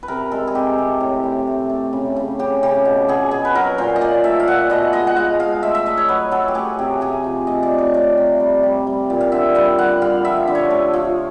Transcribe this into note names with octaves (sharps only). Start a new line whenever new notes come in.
B4
C3 A#4
G#3 A4
G#4
C3 G4
C3
A2
A2
A3
A3
C#3
C#3
C#3 G4
C#3 G4
B2
B2 G#4
B2 G#4
B4
F#3 A#4
A#2 C5
D#5
A#2 D5
A3 E5
F5
A#2 F#5
B2 D#5
G#3 D#5
F#5
G#3 F5
G#3 F5
A3 E5
E5
A3 D#5
C#5
F#3 B4
F#3 A4
G4
A3 G#4
C3 G4
C3 G#4
F3
A3 D#5
D5
A3
C#5
A3 D5
C3
G3
G3
G3
A#2
F5
D3 E5
G3 F5
G3 F#5
G3 F5
F3 E5
D3
C#5
A3
F3